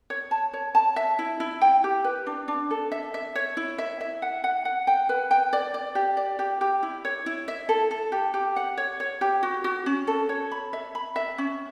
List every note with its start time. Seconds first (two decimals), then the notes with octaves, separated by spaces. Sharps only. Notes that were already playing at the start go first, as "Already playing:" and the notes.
0.10 C#5
0.31 A5
0.53 C#5
0.75 A5
0.96 E5
1.19 E4
1.40 E4
1.62 G5
1.84 G4
2.04 B4
2.27 D4
2.48 D4
2.71 A4
2.92 E5
3.14 E5
3.35 C#5
3.57 E4
3.78 E5
4.01 E5
4.22 F#5
4.44 F#5
4.65 F#5
4.87 G5
5.09 B4
5.31 G5
5.53 D5
5.74 D5
5.95 G4
6.17 D5
6.39 G4
6.61 G4
6.83 E4
7.05 C#5
7.26 E4
7.48 E5
7.69 A4
7.91 A4
8.12 G4
8.34 G4
8.56 F#5
8.78 C#5
9.00 C#5
9.21 G4
9.43 F#4
9.64 F#4
9.86 C#4
10.07 A4
10.29 C#5
10.51 B5
10.73 E5
10.95 B5
11.16 E5
11.38 C#4